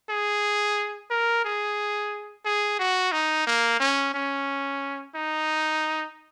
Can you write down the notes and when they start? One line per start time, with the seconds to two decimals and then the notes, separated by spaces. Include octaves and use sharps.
0.09 G#4
1.10 A#4
1.45 G#4
2.45 G#4
2.79 F#4
3.12 D#4
3.47 A#3
3.80 C#4
4.14 C#4
5.15 D#4